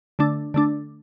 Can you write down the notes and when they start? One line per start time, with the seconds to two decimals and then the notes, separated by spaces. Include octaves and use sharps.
0.19 D3 A3 D4
0.54 D3 A3 D4